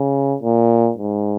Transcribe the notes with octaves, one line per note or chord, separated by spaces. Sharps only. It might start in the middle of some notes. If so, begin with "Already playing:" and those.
Already playing: C#3
A#2
G#2